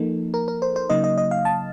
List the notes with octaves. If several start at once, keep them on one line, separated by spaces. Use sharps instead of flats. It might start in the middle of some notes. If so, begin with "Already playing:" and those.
Already playing: F3 A#3 D#4 A4
A#4
A#4
C5
C5
C#3 F#3 A#3 D#4 D#5
D#5
D#5
F5
A5